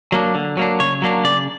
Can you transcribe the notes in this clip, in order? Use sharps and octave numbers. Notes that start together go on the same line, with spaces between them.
F#3 A#3 D4
D3
F#3 A#3 D4
C#3 C#5
F#3 A#3 D4
C#3 D5